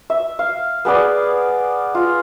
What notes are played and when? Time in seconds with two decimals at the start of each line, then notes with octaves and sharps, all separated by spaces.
0.10 E5
0.39 F5
0.85 B3 G#4 B4 D5
1.95 F4